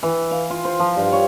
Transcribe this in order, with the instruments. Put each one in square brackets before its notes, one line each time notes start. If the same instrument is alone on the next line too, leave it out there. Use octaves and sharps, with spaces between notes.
[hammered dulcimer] E3
F5
F4
C5
F3
G2
C#5